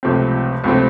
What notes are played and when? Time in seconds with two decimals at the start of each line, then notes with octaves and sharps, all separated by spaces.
0.03 C#2 C3 F3 A3 C4
0.64 C#2 C3 F3 A3 C4